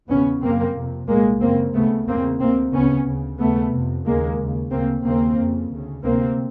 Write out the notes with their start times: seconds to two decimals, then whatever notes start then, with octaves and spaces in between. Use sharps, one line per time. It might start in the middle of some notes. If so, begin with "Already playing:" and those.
0.09 E2 C#3 B3 C#4
0.42 F#2 C#3 A#3 C4
0.75 F2 C3
1.08 C2 A#2 G#3 A#3
1.41 F#2 C#3 A#3 C4
1.74 D2 C#3 A3 B3
2.07 E2 C#3 A#3 C4
2.40 D2 C3 A#3 C4
2.73 D2 C#3 B3 C#4
3.06 D2 C#3
3.39 D#2 C#3 A3 B3
3.72 F2 C3
4.05 D#2 C#3 G#3 A#3
4.39 D#2 C#3
4.71 D2 C#3 A#3 C4
5.04 D#2 C#3 A#3 C4
5.38 F2 C#3
5.70 D2 C#3
6.03 D2 C3 A#3 C4